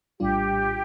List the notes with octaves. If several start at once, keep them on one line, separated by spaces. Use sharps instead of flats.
A#1 A2 G3 D4 F4 G4